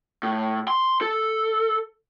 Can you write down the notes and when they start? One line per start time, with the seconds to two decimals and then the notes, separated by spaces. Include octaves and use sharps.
0.23 A2
0.68 C6
1.01 A4